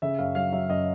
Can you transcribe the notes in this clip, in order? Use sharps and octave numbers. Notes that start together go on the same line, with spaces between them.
C#3 E5
F#2 F5
F#3 F5
F#3 E5
F#2 D#5